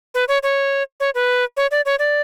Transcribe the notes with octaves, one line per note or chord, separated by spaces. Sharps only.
B4
C#5
C#5
C#5
B4
C#5
D5
C#5
D5